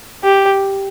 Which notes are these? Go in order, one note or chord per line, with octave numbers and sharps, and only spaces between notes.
G4